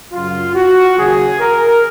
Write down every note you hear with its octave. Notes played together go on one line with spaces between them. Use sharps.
F#2 C#3 F#3 F4
F#4
D#2 C#3 F#3 G#4
A#4